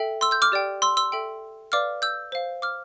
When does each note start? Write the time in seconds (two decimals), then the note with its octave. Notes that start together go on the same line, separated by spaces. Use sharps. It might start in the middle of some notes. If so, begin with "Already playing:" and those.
Already playing: A4 E5 G5
0.21 C6 E6
0.31 E6 G6
0.42 D6 F6
0.52 G4 D5 G5
0.82 C6 E6
0.97 C6 E6
1.12 A4 E5 G5
1.72 B4 D5 F5 D6 F6
2.02 E6 G6
2.32 C5 F5
2.62 D6 F6